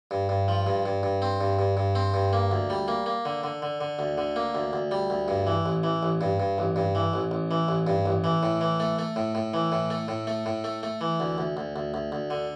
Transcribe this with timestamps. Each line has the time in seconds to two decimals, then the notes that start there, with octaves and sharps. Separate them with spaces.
0.11 G2
0.29 G2
0.48 F3
0.66 G2
0.85 G2
1.03 G2
1.22 C4
1.41 G2
1.59 G2
1.77 G2
1.95 C4
2.14 G2
2.33 A#3
2.51 D2
2.70 G3
2.88 A#3
3.06 A#3
3.25 D3
3.44 D3
3.62 D3
3.81 D3
3.99 D2
4.18 D3
4.36 A#3
4.55 D2
4.73 D2
4.91 G3
5.10 D2
5.28 G2
5.47 E3
5.66 A1
5.83 E3
6.03 A1
6.21 G2
6.40 G2
6.58 A1
6.76 G2
6.95 E3
7.14 A1
7.31 A1
7.51 E3
7.68 A1
7.87 G2
8.06 A1
8.24 E3
8.43 A2
8.61 E3
8.80 A3
8.99 A3
9.16 A2
9.35 A2
9.54 E3
9.72 A2
9.90 A3
10.08 A2
10.27 A3
10.46 A2
10.64 A3
10.83 A3
11.01 E3
11.20 D2
11.38 D2
11.57 D2
11.76 D2
11.94 D2
12.12 D2
12.30 D3